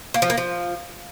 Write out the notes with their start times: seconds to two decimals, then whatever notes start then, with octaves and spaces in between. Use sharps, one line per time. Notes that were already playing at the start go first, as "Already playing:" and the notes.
0.14 A#3
0.22 F3
0.30 A#3
0.37 F3